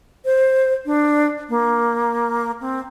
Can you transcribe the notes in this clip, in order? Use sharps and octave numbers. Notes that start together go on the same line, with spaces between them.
C5
D4
A#3
C4